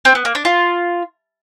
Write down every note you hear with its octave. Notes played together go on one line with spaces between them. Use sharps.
C4
B3
A#3
D4
F4